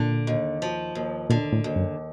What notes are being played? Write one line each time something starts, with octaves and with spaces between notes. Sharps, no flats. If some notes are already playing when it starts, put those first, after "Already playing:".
Already playing: A#2 D3
D#2
F3
D#2
A#2 D3
A2
D#2
F#2